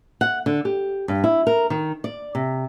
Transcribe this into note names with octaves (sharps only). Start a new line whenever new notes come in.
F#5
D3
G4
G2
E4
A#4
D#3
D5
C3